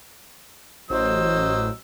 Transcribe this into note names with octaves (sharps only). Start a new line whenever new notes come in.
A1 F#3 C5 D#5 E6